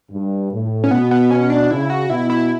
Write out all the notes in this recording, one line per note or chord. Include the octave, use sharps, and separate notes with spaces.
G2
A2
C#4
B2 B3
B3
C#4
D4
C#3 E4
F#4
B2 E4
E4